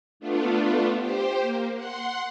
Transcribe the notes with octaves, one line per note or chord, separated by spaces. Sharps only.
A3 B3 D4 F4
G4 C5
A#3
F#5 C6